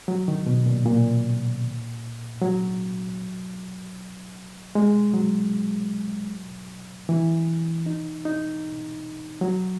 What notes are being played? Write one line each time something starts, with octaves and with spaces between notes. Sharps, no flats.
F#3
D#3
B2
A#2
A#2
F#3
G#3
F#3
E3
D#4
D#4
F#3